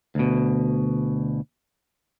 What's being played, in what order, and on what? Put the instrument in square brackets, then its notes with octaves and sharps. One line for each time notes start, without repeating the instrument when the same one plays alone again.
[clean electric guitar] D2 B2